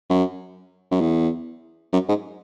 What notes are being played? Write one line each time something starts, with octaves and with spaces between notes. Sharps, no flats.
F#2
F#2
E2
F#2
G#2